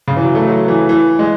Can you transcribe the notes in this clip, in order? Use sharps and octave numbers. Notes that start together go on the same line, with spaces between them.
C#3
E3
F#3
A3
F#3
E3
E3
G#3